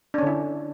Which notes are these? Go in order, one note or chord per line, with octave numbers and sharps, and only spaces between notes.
D3 C#4 D4 E4